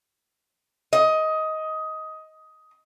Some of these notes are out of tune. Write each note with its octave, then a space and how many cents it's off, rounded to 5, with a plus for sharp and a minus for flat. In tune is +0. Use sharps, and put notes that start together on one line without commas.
D#5 +15